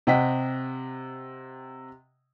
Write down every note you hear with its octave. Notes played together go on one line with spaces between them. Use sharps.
C3 D#5 F#5 G5 B6